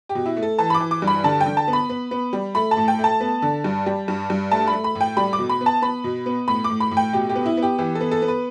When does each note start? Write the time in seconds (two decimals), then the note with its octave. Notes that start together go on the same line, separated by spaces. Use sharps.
0.09 G4
0.15 B2
0.26 E4
0.37 A3
0.42 A4
0.58 E3 A5
0.70 B5
0.75 D6
0.80 E3
0.91 D6
1.02 G2
1.07 B5
1.24 D3 A5
1.41 G5
1.46 D3
1.57 A5
1.68 B3
1.73 B5
1.89 B3
2.11 B3
2.33 G3
2.55 A3 B5
2.71 A5
2.77 A2
2.88 G5
2.99 A3 A5
3.20 B3
3.42 D3
3.64 G2
3.86 G3
4.08 G2
4.30 G2
4.51 A3 A5
4.67 B5
4.73 A3
4.84 B5
4.95 A2
5.01 G5
5.17 G3 B5
5.33 D6
5.39 B2
5.49 B5
5.61 B3
5.66 A5
5.82 B3 B5
6.04 B2
6.26 B3
6.48 A2 B5
6.64 D6
6.70 A2
6.80 B5
6.91 A2
6.97 G5
7.13 B2 G4
7.29 G4
7.35 B3
7.46 E4
7.57 B3
7.63 G4
7.78 E3 G4
7.95 A4
8.00 B3
8.11 A4
8.22 B3
8.28 B4